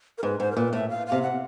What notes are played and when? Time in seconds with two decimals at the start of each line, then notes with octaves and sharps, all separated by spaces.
0.18 A#4
0.23 G#2 B4
0.40 G#2 C5
0.52 A#4
0.57 A#2 B4
0.73 A2 E5
0.89 F5
1.07 F5
1.12 C3
1.22 F#5